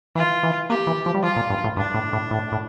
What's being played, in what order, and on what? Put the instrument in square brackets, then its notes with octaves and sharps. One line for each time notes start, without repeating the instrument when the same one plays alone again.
[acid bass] E3 [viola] F4
[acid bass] E3
[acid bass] A#3 [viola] G4
[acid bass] E3
F3
G3
[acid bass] F3 [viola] F4
[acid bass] A#2
G2
A2
[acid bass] G2 [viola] D4
[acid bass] A2
A2
A2
A2